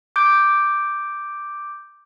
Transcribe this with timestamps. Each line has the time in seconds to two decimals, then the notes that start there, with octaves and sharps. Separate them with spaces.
0.16 D6 G6 D7